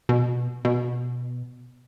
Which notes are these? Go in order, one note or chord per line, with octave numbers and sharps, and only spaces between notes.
B2
B2